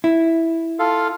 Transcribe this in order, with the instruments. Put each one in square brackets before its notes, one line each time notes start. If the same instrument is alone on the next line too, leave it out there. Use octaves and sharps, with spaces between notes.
[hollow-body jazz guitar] E4
[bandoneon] F4 A4 F5